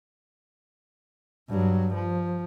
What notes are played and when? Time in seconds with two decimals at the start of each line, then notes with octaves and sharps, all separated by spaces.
1.49 G2 F#3
1.94 F3